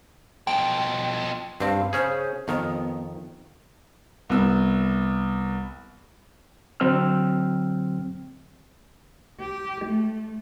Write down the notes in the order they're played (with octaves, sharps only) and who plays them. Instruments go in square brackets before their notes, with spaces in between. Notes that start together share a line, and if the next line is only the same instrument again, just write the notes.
[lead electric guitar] B2 F3 [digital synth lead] G5
[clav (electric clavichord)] G2 C4 [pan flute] F5
[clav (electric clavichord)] C#3 C#4 G#4 [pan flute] C5
[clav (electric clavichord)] F2 D#3 [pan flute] B3
[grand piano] C2 B3 E6
[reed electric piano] D3 F#3 C4 G5 E6 F6
[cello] G4
A3